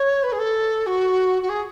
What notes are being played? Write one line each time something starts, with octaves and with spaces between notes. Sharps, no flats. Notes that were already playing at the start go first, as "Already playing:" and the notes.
Already playing: C#5
B4
G#4
A4
F#4
F#4
G#4